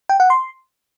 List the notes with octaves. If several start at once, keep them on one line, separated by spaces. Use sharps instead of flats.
G5
F#5
C6